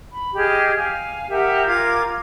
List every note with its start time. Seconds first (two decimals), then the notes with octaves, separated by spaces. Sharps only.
0.12 B5
0.35 G4 G#4 D#5 F6
0.77 F5 G#5
1.30 G4 A#4 E5 F#5
1.67 F4 A#4 D6 G#6